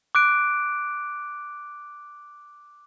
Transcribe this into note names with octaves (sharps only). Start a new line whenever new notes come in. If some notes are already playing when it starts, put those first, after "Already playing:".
D6 F#6 D7